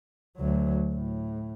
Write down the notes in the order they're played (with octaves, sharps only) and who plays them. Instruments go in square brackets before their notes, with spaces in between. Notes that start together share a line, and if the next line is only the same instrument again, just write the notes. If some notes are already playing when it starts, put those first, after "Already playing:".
[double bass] D2 F#3
A2